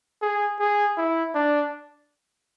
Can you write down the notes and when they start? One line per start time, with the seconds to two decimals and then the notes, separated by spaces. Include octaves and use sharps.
0.22 G#4
0.60 G#4
0.97 E4
1.35 D4